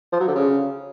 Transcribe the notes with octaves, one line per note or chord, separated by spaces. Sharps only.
F3
F#3
D3
C#3